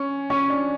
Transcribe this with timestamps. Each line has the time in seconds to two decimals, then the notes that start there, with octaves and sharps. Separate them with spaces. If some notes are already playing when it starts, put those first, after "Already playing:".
Already playing: C#4
0.30 C#4
0.50 D4